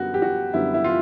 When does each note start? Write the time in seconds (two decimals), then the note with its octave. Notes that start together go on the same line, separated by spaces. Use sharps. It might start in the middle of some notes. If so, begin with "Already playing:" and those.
Already playing: F#2 D3 G3 B3 F#4
0.14 G4
0.22 F#4
0.54 F#2 D3 G3 B3 E4
0.74 E4
0.84 F4